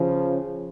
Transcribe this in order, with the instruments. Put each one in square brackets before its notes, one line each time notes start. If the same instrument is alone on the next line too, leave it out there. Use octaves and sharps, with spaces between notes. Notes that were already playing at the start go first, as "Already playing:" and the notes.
Already playing: [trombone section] C#3 F3